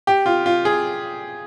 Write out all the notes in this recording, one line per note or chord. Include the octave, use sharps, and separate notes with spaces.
G4
F4
F4
G#4